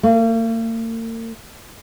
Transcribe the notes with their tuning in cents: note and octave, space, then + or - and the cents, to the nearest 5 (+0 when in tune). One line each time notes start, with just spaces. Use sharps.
A#3 -45